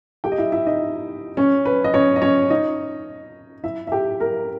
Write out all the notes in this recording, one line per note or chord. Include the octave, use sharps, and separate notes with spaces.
G4 G5
D#5
E4 E5
E4 E5
D#4 D#5
C#4 C#5
B4
D#5
C#4 C#5
D#5
C#4 C#5
D#4 D#5
E4 E5
E5
G4 G5
A#4 A#5